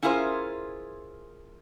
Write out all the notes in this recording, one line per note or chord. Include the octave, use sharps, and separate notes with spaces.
C#4 E4 F4 G#4 A#4 C5